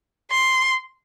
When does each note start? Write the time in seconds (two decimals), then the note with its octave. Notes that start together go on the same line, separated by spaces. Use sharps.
0.31 C6